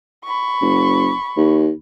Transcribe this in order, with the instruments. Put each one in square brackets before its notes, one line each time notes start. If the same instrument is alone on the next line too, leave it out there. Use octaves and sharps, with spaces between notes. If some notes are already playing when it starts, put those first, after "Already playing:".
[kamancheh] B5 C#6
[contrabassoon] F#1
D#2